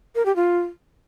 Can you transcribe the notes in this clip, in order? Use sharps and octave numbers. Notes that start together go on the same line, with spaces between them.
A#4
G4
F4